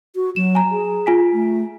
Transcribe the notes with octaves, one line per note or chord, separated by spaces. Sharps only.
F#4
F#3 E7
G#5 A#5
G#4
F4 G#5 B6
A3